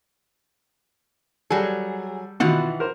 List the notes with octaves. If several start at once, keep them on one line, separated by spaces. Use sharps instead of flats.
F#3 G3 G#4 A4
B2 D#3 E3 F4 F#5
A#4 C5